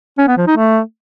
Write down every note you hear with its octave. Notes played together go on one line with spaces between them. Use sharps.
C#4
B3
F3
D#4
A3